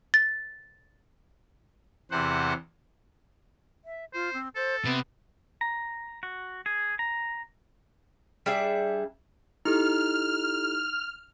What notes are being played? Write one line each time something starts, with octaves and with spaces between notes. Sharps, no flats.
A6
E2 C3 C5 F#5
E5
F4 C5
C4
A4 C5
C3 B3
A#5
F#4
G#4
A#5
G3 D4 G#4 E5
D#4 E4 G4 A4 F6